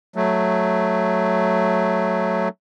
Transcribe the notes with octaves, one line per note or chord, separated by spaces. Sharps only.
F#3 A3